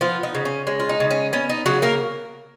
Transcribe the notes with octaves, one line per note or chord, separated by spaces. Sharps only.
F3 B3 F4
D#4
C#3
C#4
G#3 C#4
F4
D#4
C#3
C#4
B3 C#4
D#4
C#3 F#3 F#4
A#3 A#4